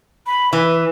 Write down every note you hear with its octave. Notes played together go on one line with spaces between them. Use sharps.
B5
E3 B4